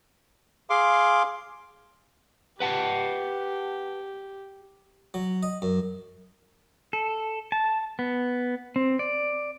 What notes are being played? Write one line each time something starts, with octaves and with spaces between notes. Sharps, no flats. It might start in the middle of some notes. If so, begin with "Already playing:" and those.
G#4 F5 C6 D6
G4 B4 F#5 A5
F#3
D#5
F#2
A4
A5
B3
C4
D5